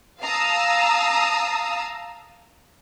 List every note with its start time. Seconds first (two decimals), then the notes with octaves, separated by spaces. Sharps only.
0.21 F5 A5 A#5 D#6 E6